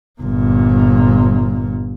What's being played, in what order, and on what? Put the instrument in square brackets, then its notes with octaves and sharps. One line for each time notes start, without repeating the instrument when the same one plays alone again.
[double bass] G1 A#2